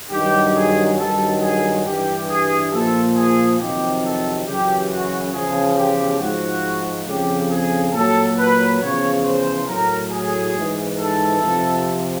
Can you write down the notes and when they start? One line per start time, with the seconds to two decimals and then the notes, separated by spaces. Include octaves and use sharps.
0.11 G2 D#3 F#3 G4
0.55 G#4
0.98 G2 D#3 F#3 A4
1.42 G#4
1.85 G2 E3 G4
2.28 G#4
2.72 A#2 F3 A4
3.15 G#4
3.58 F2 C3 D#3 F#3 G4
4.02 A4
4.46 F#2 C#3 E3 G4
4.89 F#4
5.32 E2 C#3 F3 G#4
5.76 G4
6.19 G#2 F3 F#4
7.06 F2 C#3 F3 G4
7.50 G#4
7.93 A#2 F#3 A4
8.37 B4
8.80 E2 C#3 F3 C#5
9.24 C5
9.67 A2 F#3 A#4
10.10 G#4
10.54 G#2 E3
10.97 A4
11.41 F2 C3 F3